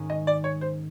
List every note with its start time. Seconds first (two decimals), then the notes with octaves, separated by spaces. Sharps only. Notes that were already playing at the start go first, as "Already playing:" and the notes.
Already playing: G#2 D#3 G#3 C#4
0.10 D#5
0.27 D5
0.44 C#5
0.61 C5